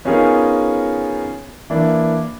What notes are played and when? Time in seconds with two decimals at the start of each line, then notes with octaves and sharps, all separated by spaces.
0.05 B3 C#4 D#4 F4 G#4 A#4
1.70 E3 A#3 D4 E4